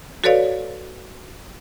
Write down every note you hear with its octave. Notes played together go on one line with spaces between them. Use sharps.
F#4 A4 B4 C#5 D5 F5